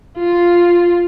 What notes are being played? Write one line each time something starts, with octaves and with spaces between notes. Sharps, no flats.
F4